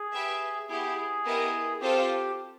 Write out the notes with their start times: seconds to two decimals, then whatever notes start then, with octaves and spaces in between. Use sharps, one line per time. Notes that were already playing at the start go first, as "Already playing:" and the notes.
Already playing: G#4
0.13 G4 B4 E5
0.69 B3 E4 G4 G#4
0.97 G#4
1.25 B3 E4 G4 A#4 D#5
1.81 C4 F4 G4 A4 C5 F5